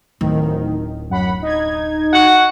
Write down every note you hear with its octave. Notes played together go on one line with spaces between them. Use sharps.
D1 D#3
F#2 F#5 B5
D#4 G#6
F#4 F#5